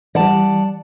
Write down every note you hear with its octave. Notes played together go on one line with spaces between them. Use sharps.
E3 G3 D5 F#5 A5